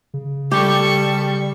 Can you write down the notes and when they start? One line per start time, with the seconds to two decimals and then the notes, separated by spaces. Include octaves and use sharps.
0.14 C#3
0.51 G3 G4 A4 C#6